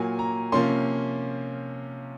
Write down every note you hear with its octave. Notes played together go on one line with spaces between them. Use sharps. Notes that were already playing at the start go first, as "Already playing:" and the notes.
Already playing: A#2 F#3 A#3 G#5
A#5
C3 F3 A#3 C#4 C6